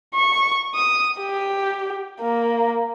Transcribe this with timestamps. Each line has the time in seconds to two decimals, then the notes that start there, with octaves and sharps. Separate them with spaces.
0.15 C#6
0.74 D#6
1.21 G4
2.21 A#3